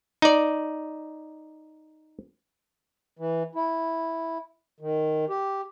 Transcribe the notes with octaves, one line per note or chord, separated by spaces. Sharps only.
D#4 D5
E3
E4
D#3
G4